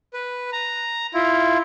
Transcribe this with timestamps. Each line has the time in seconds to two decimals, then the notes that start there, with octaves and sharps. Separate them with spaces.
0.14 B4
0.53 A#5
1.14 E4 F4